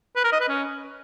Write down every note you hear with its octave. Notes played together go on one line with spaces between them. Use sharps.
B4
A#4
D#5
B4
C#4